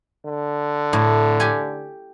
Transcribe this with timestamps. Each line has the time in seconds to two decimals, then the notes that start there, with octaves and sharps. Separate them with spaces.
0.25 D3
0.93 A2
1.40 G4 G#5